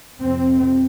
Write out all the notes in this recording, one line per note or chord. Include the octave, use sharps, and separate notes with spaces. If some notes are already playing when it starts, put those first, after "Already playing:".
F2 C3 C4